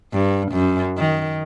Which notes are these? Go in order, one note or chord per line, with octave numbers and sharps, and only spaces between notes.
G2
F#2
D#3